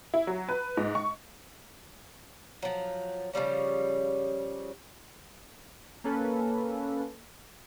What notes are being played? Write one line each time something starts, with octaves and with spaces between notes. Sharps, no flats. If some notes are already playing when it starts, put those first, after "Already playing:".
E4
F#3
B4
G#2
C#6
F3 F#3
C#3 F3 G3 C#4
A#3 C#4 A4 B4